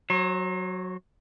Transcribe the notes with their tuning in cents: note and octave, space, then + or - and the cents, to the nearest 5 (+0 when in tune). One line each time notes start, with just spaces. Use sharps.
F#3 +0 C5 +45